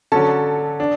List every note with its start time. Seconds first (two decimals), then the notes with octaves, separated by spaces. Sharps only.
0.12 D3 F#3 C#4 A4 A5
0.80 D4